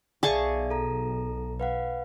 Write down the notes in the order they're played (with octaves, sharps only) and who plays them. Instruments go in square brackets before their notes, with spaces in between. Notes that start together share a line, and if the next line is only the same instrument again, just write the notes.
[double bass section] B1 [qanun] G#4 A5 C#6 [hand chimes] D5 E5 F5
[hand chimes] A4 A#5
B4 F5 F#5